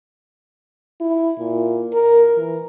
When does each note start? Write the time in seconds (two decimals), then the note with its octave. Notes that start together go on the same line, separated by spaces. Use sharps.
1.01 E4
1.39 A#2
1.93 A#4
2.37 E3